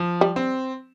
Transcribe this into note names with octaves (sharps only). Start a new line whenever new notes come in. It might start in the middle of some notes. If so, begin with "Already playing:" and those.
Already playing: F3
G3
C4